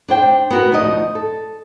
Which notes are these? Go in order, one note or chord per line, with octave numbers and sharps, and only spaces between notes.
D4 C5 G5
B3 F#4 A#4
D2 F3 D#4 D#5
A4